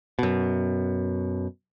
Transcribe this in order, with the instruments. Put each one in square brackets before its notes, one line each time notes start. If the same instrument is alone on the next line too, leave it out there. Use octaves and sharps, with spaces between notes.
[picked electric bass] F#2 B2